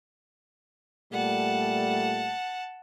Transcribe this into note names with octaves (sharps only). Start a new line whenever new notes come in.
A#2 G3 A3 F#5 A5